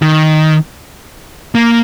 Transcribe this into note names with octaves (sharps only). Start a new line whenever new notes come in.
D#3
A#3